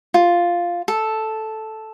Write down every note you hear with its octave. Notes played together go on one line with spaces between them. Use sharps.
F4
A4